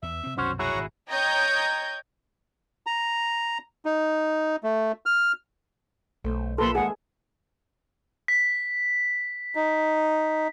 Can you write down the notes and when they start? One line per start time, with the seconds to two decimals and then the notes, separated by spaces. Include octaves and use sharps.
0.03 E2 E5
0.24 C3 C4
0.38 C2 F#2 B2 C#4 F#4 C5
0.59 E4 F#4 G#4 C#5 F#5 A#5
0.75 G#1 A#2
1.10 C#5 D#5 G5 A#5 G6 G#6
2.86 A#5
3.85 D#4
4.64 A3
5.06 F6
6.24 B1 A3 C5
6.58 F3 A#3 G4 A4 B4 B5 C6
6.75 D#2 G#3 G#4 E5 F#5
8.28 B6
9.55 D#4